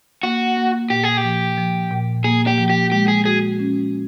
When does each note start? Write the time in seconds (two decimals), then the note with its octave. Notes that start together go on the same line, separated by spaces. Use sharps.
0.23 A#3 F#4
0.57 A#3
0.90 A#2 G4
1.04 G#4
1.17 G4
1.24 F3
1.58 F3
1.91 A#2
2.24 A#3 G#4
2.47 G4
2.58 F3
2.70 G4
2.92 G#3 G4
3.08 G#4
3.25 F#4 G#4
3.59 C#4